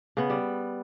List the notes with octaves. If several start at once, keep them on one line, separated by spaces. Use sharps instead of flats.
C#3 B3
G3